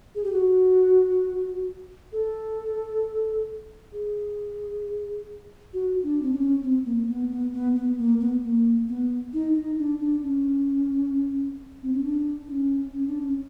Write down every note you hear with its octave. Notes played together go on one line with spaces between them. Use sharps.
G#4
G4
F#4
A4
G#4
F#4
D4
C4
D4
C#4
C4
A#3
B3
B3
B3
B3
A#3
B3
A#3
B3
D#4
D#4
D4
D4
C#4
C4
C#4
D4
D4
C#4
C#4
D4
C#4